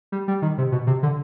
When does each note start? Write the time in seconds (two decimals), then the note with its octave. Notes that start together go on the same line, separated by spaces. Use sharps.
0.12 G3
0.28 G3
0.42 D#3
0.58 C3
0.72 B2
0.87 C3
1.03 D3